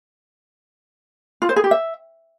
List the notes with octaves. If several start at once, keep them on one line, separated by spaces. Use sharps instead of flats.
F4
C5
G#4
G4
E5